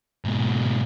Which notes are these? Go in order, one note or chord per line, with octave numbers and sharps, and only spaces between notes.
G#2 B2